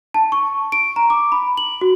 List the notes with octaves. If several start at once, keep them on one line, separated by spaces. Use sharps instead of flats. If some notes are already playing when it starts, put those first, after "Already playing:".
A5
C#6
D7
A#5
D6
B5
F#7
F#4